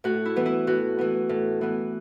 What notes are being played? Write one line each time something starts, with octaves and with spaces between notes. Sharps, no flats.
A2 F#4
E4
E3 B3
E4
A2 F#4
E3 B3
A2
E3 B3